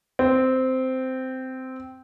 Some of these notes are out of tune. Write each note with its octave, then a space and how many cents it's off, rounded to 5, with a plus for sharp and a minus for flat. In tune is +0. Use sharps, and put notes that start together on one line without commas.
C4 -10